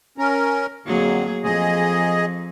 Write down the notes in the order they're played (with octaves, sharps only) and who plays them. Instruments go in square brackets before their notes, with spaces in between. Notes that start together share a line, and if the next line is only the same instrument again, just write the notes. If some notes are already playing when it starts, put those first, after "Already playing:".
[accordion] C#4 A#4
[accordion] F2 D3 [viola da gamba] F#3 A#3 G#4
[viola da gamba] F2 [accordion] G#4 D#5